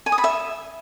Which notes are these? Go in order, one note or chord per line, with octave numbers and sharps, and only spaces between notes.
G#5
D#6
B5
E5